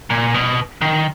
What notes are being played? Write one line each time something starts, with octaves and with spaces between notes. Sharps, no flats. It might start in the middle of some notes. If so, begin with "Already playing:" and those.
A#2
B2
D#3